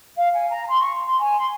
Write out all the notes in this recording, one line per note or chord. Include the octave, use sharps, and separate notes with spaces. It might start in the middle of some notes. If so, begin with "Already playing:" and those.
F5
G#5
A#5
C6
C#6
C6
G#5
C6